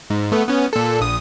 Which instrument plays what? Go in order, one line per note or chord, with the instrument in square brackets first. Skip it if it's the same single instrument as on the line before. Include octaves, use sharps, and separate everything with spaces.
[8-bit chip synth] G#2
A3 B3
B3 C#4
A#2 A4
A#1 D#6